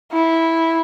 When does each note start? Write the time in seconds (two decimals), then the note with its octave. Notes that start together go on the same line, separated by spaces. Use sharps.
0.12 E4